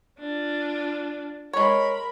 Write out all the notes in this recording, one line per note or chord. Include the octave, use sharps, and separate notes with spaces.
D4 F4
G#3 A#4 C#5 B5